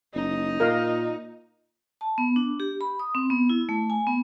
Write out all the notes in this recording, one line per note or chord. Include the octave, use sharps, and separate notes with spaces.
F#1 D#4
A#2 A#4 D#5 F5
A5
B3
D4
G4
B5
D#6
C4
B3
E4
A3
G#5
B3